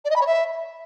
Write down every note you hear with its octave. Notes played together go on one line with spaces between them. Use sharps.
D5
D#5
B5
C#5
E5